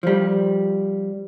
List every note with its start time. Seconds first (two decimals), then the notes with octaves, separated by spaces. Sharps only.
0.03 F3 G3